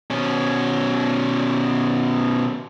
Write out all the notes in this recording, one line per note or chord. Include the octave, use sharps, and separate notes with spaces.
B2 C#4